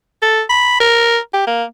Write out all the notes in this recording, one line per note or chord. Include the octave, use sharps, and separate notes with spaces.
A4
B5
A#4
G4
A#3